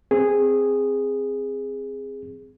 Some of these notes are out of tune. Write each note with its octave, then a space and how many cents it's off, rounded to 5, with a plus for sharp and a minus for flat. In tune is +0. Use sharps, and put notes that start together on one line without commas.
C4 +0 G#4 -10